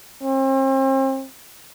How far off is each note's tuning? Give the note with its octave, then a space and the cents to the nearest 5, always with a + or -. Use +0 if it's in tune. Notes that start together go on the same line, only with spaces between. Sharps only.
C4 +40